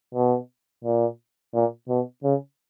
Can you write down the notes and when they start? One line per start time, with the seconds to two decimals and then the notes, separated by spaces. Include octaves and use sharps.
0.15 B2
0.84 A#2
1.54 A#2
1.89 B2
2.24 C#3